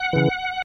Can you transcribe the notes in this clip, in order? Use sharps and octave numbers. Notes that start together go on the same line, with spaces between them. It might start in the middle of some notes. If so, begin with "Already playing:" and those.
Already playing: F#5
C#3 E3